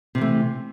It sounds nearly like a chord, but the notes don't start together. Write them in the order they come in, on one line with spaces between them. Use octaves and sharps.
C3 E3 A3